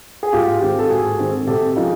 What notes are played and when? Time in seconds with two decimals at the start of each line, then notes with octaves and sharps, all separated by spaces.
0.23 G#4
0.33 G#2 F4 G4
0.61 D#3 G#3 C4 F4 G4
0.79 A4
0.90 G#2 F#4 G#4
1.19 D#3 G#3 C4
1.47 C3 G4 A4
1.76 F3 G#3 C#4 D#4 F4